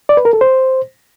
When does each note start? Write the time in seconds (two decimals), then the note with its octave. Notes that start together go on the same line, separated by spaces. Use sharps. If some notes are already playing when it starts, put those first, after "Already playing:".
0.09 D5
0.17 B4
0.25 A#4
0.33 A4
0.41 C5